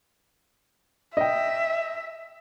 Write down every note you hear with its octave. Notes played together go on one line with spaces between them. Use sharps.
D#5 E5 G5